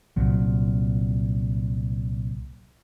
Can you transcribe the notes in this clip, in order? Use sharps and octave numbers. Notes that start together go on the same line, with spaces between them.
C2 A#2 F#3